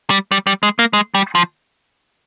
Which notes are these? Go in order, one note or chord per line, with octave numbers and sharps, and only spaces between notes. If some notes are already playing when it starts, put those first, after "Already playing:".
G3
G3
G3
G#3
A#3
G#3
G3
F3